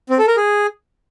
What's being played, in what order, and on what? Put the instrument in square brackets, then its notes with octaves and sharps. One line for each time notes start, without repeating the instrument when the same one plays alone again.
[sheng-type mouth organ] C4
A4
A#4
G#4